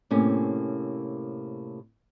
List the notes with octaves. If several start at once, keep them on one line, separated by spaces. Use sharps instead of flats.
A2 C3 A#3 C#4 G#5